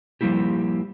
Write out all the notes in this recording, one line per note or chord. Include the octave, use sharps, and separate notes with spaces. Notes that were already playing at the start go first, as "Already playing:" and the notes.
F3 G3 A#3 E4 G4